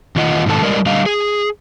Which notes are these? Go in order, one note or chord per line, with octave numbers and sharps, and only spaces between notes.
E2 D#3 F4 D#5 F#5
G#2 B2 D#3 A4 A5
G3 G#3 A#4 D5 D#5
D3 G3 D#5 F5
G#4